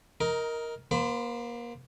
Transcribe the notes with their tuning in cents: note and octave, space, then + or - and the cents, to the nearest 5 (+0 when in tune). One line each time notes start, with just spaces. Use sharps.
D#4 +20 A#4 +0
A#3 +30 C5 -10 B5 +30